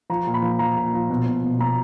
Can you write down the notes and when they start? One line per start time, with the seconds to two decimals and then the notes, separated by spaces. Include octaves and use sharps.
0.10 F3 A#5
0.27 A#2
0.34 B5
0.42 F3
0.59 F3 A#5
0.77 A#2
0.93 F3
1.10 B2
1.26 B2
1.44 B2
1.59 B2 A#5